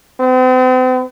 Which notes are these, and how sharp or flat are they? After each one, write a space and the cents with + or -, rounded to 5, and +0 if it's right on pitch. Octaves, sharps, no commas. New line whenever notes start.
C4 -40